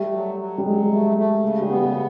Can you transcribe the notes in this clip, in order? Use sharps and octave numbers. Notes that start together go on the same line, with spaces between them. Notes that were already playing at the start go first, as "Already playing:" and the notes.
Already playing: G3 A3
F#3
F#3
G3
F#3 G#3
A3
A3
C#3
G3
B3
G3